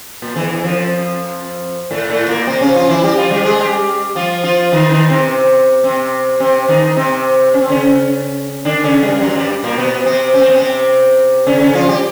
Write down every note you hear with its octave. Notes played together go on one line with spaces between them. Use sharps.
A#2
E2 E3
E2 E3
F2 F3
A2 A3
A2 A3
A#2 A#3
C3 C4
C#3 C#4
F3 F4
E3 E4
G3 G4
F3 F4
G3 G4
G#3 G#4
G3 G4
F3 F4
F3 F4
D#3 D#4
D#3 D#4
C3 C4
C3 C4
C3 C4
D#3 D#4
C3 C4
C#4
C4
C#3 C#4
D3 D4
C#3 C#4
G2 G3
F#2 F#3
G2 G3
A#2 A#3
B2 B3
C3 C4
C#4
C4
B3
C3 C4
C#3 C#4
C#3 C#4
F3 F4
G3 G4